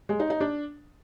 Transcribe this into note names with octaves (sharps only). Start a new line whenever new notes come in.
G#3
D#4
D#4
D4